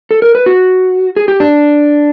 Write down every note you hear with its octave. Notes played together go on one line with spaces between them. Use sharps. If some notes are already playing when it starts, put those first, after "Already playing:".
A4
A#4
B4
F#4
G#4
G4
D4